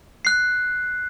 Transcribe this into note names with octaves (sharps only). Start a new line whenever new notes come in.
F#6 C7